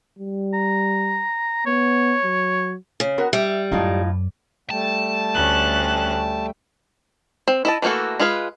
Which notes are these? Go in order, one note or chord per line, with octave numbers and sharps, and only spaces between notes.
G3
A#5
B3 C#5
F#3
C#3
B3 F#4 A#4
G3 E5
F#2 A2 D#4 F4
G3 A3 G5 A5
D2 C#4 F#6
C4
E4 D#5 A5
E3 A3 A#3 F#4 A4
G#3 F4 G#4 B4 F5